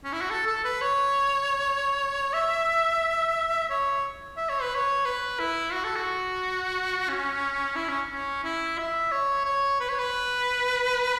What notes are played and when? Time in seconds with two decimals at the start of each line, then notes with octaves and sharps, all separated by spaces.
0.04 C#4
0.13 E4
0.21 F#4
0.30 A4
0.47 A4
0.64 B4
0.81 C#5
2.34 E5
3.70 C#5
4.37 E5
4.49 C#5
4.62 B4
4.74 C#5
5.05 B4
5.39 E4
5.73 F#4
5.84 A4
5.96 F#4
7.09 C#4
7.76 E4
7.88 C#4
8.12 C#4
8.44 E4
8.78 E5
9.12 C#5
9.45 C#5
9.80 B4
9.89 C#5
9.99 B4